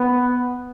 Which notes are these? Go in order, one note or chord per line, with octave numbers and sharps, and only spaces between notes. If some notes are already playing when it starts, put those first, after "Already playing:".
Already playing: B3